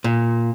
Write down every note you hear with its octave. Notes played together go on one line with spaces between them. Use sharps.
A#2